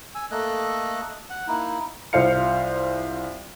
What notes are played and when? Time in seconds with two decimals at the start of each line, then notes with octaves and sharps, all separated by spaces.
0.15 G#5 E6
0.31 A3 A#3 A4 D#5 F#6
1.30 F#5
1.48 A#3 D#4 E4
2.13 C2 F4 C5 F5 C#7